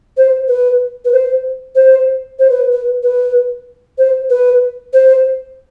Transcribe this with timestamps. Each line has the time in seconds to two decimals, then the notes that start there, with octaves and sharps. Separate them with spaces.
0.17 C5
0.48 B4
1.05 B4
1.12 C5
1.75 C5
2.39 C5
2.50 B4
2.72 B4
3.03 B4
3.98 C5
4.30 B4
4.93 C5